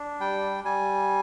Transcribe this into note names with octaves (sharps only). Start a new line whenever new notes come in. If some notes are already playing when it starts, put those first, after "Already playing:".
Already playing: D4
G3 G5
G3 G#5